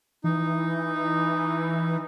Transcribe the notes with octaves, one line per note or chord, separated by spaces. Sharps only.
E3 D#4